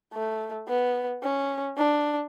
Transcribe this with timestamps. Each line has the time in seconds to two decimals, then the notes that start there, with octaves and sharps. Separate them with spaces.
0.14 A3
0.68 B3
1.23 C#4
1.77 D4